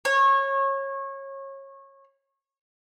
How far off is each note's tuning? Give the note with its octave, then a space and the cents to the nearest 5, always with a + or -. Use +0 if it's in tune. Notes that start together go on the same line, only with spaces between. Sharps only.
C#5 -25